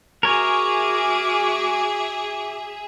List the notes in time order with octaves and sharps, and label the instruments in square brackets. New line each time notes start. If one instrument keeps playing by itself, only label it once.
[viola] F#4 D6 [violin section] G#4 E5 [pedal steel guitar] A#4 C#5